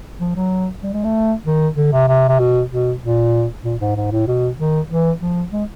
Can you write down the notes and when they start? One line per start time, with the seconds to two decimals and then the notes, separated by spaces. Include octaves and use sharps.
0.20 F3
0.36 F#3
0.83 G3
0.93 G#3
1.04 A3
1.46 D#3
1.77 D3
1.93 C3
2.08 C3
2.29 C3
2.40 B2
2.71 B2
3.02 A#2
3.64 A#2
3.81 G#2
3.97 G#2
4.12 A2
4.27 B2
4.59 D#3
4.90 E3
5.22 F3
5.53 G#3